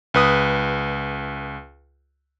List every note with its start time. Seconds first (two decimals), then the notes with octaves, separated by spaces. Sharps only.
0.14 C#2 B4 D#6